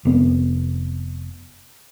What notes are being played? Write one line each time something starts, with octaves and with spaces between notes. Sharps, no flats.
F1 B3